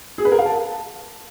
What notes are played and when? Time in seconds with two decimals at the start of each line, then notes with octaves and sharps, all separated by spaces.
0.18 G#4
0.25 B4
0.32 A#4
0.39 F5
0.45 A5